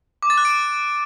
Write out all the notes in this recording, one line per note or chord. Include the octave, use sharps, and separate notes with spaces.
D6
A6
F#6
D7